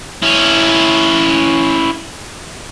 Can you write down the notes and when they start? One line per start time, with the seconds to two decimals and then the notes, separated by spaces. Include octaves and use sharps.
0.23 C#4 E4